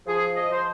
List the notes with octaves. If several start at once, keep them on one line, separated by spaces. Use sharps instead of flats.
F3 G#4
D#5
F3 C5